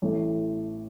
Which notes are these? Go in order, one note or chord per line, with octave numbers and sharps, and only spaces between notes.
A1 A2 A3